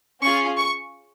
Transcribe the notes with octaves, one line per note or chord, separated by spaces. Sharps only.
C#4 F4 G#4 C#6
C#6